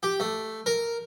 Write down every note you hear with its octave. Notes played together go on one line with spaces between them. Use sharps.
G4
A3
A#4